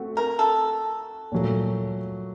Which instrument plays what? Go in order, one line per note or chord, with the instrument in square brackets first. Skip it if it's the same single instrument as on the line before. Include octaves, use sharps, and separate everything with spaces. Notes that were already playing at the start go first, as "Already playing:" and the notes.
Already playing: [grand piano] A3 C4 F#4
[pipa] A#4
A4
[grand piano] A#2 F#3 A3